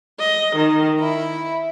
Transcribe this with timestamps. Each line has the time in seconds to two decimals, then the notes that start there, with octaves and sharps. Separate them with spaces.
0.19 D#5
0.56 D#3
0.99 E4